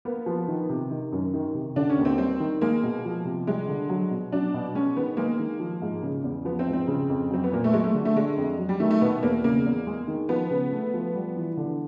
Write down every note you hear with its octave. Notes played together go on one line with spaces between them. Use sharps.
A#3 B3
F3
D#3
C3
D#3
F#2
D#3
C3
D3 D4
C#4
D#2
C4
G3 C4
D#3
G#3 A#3
B2
F3
C3
G3 G#3
D3
F#3
B2
F#3 D4
B2
G#3 C#4
D#3 B3
G#3 A#3
D#3
F3
G#2
C#3
E2
F3 B3
C4
G#2
C4
C#3
F2
F#3 C4
B3
A#2 A#3
A3
F#3 G#3
A3
D3
A3
D3 G#3
F2
F#3
G3
D#3 A3
A3
B2 B3
E2 A#3
C#3 A#3
E2
G#3
D#3
F3 B3
C#3
A3
F3
G3
E3
D3